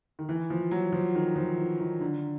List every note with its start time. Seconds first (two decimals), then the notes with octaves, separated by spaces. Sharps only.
0.19 D#3
0.29 E3
0.50 F3
0.71 F#3
0.93 F3
1.15 D#3
1.36 F3
1.58 E3
1.80 D#3
2.01 D3